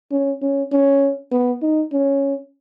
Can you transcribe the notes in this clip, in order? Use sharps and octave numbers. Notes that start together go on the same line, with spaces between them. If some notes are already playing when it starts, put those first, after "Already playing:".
C#4
C#4
C#4
B3
D#4
C#4